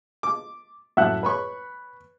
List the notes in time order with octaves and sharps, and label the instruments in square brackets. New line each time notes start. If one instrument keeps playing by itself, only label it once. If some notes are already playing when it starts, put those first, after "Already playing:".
[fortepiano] D6
[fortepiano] F#2 A2 [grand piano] E5 F#5 F#6
[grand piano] B4 [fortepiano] C#5 B5 C#6